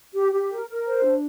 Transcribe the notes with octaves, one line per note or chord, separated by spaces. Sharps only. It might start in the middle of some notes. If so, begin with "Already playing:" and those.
G4
G4
A#4
A#4
C5
D4